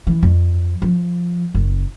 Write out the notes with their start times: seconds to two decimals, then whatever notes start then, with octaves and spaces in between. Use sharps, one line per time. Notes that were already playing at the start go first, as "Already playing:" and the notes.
0.07 E3
0.23 F2
0.82 F3
1.54 F#1